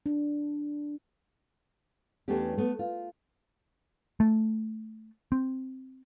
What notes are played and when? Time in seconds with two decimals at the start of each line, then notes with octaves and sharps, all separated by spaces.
0.06 D4
2.28 E2 A3 B3 C#4 D4 G4
2.57 A3 B3
2.79 F4
4.20 A3
5.32 C4